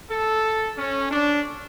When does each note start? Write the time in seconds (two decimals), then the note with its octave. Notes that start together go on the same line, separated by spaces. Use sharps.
0.11 A4
0.78 C#4
1.11 D4